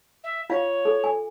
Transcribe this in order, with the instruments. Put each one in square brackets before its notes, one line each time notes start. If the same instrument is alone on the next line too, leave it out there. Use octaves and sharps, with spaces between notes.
[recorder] E5
[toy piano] F4 F5 [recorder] C#5
[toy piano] A4
G#5